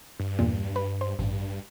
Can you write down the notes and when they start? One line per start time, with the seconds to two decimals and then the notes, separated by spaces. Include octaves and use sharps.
0.20 G2
0.39 E2 A#2
0.76 B4
1.01 C5
1.19 A1 G2